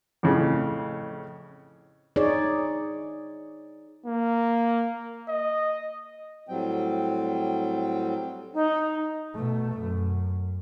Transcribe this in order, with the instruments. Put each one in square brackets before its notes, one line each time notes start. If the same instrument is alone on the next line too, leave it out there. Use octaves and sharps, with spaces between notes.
[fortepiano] F2 A2 C#3
[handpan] D#4 G#4 C#5 D5
[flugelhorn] A#3
D#5
[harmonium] A2 F#3 G3 C4 G5
[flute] D#4
[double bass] B2 A3
F#2